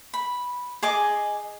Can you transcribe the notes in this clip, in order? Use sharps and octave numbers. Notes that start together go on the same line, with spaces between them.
B5
G#4 D#5 D6